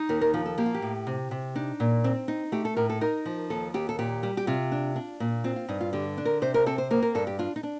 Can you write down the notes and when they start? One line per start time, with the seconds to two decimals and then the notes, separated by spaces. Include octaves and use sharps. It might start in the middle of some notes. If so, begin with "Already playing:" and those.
Already playing: D#4
0.09 D#2 A#4
0.21 A#4
0.34 F3 F4
0.46 A4
0.58 A#3 G4
0.66 F4
0.74 G4
0.82 A2
1.07 C3
1.31 C3
1.55 D4 D#4
1.80 A#2
2.04 C4
2.28 D#4
2.52 A3 G4
2.65 A4
2.77 A2 A#4
2.90 A4
3.01 D#4 A#4
3.26 F3
3.50 D#2 A4
3.74 D#2 G4
3.89 A4
3.99 A#2 G4
4.23 G3
4.37 G4
4.47 C3 F4
4.72 D4
4.96 D4
5.20 A#2
5.44 C4 F4
5.56 F4
5.69 G2 D#4
5.81 F4
5.93 D3 G4
6.17 D4
6.25 A#4
6.42 C3 C5
6.54 A#4
6.66 C4 A4
6.78 C5
6.91 A#3 A#4
7.03 A#4
7.15 G2 A4
7.27 G4
7.39 D4 F4
7.56 D#4
7.63 D4